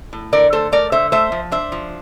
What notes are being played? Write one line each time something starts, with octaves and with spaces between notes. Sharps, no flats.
A2
D3 A#4 D5
A3 A4 C5
A3 A#4 D5
D3 C5 E5
A3 C5 E5
F3
D4 C5 E5
F3